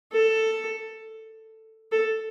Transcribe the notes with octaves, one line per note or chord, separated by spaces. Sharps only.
A4
A4